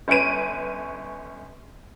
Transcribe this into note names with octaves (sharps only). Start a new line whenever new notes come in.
G1 C#4 B4 D7 D#7